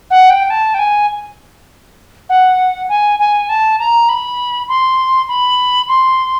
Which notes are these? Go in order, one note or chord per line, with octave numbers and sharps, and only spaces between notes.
F#5
G5
A5
G5
G#5
F#5
G#5
G#5
A5
A#5
B5
C6
B5
C6